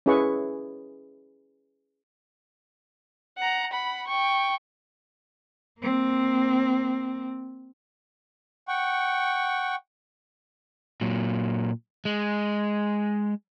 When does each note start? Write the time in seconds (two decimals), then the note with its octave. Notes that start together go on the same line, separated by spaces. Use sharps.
0.06 C#4 E4 G#4 B4 E5 C#6
3.38 F#5 A#5
3.72 F#5 B5
4.07 G5 C#6
5.81 A#3 C4
8.68 F#5 G5 C#6
11.01 A#2 F#3
12.05 G#3